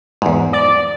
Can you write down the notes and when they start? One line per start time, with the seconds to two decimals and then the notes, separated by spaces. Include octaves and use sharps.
0.22 E2 G#2
0.53 D5